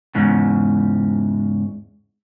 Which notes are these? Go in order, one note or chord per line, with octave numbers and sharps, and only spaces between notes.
E2 G#2 C#3